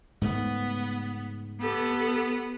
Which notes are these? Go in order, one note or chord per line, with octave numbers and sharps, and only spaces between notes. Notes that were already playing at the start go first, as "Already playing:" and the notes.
G#2 C#3 A3 B3
B3 G4 A4